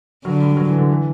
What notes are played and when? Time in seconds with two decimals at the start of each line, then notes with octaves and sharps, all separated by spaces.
0.25 D3 F#3
0.41 G3
0.57 F#3
0.68 E3
0.78 D3
0.89 E3